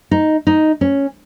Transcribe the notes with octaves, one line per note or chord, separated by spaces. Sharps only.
D#4
D#4
C#4